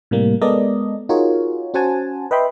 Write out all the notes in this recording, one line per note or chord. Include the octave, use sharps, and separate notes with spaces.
A2 C3 G3 A#3
G#3 B3 A4 A#4 D5 D#5
D#4 F4 F#4 G#4 A#4 C#5
C#4 F#4 C5 F#5 G#5 A5
B4 D#5 E5 G5 B5 C6